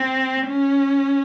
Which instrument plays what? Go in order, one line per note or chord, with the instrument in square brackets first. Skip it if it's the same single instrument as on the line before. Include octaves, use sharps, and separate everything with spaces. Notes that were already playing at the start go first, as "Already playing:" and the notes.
Already playing: [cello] C4
C#4